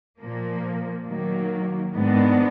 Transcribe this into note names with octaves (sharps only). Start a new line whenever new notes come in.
A#2 F3 A#3
D#3 F#3 A#3
G#2 D#3 G#3 B3 D4